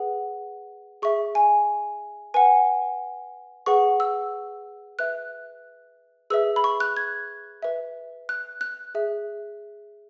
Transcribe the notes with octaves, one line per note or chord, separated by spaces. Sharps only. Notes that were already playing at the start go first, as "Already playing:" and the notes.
Already playing: G#4 B4 F#5
G#4 E5 C#6
G#5
B4 F#5 G#5
G#4 B4 F#5 C#6
E6
B4 E5 F#6
G#4 B4 E5 E6
B5
C#6
F#6
G#6
B4 E5
F#6
F#6
G#4 E5